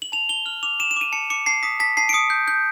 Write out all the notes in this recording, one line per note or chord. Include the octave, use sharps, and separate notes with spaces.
F#7
A5 F7
A5 G7
F6 F#7
D6 F7
D6 E7
E7
D6 D#7
A5 C#7
D6 C#7
A5 C7
D#6 B6
A5 B6
A5 C7
D7
D#6 C#7
G6
G6